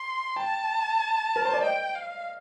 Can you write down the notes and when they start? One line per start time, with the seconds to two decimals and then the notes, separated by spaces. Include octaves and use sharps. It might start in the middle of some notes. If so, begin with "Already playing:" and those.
Already playing: C6
0.36 G5 A5
1.36 A#4
1.45 C5
1.54 D5
1.63 D#5 G5
1.95 F5